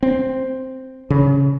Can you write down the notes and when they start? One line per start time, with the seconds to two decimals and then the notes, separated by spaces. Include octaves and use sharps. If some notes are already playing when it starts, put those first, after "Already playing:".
0.03 C4
1.10 C#3